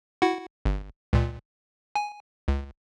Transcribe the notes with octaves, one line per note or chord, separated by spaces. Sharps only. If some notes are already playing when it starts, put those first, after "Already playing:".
E4 F#4 F#5
G1
C#2 A#2
G#5
C#2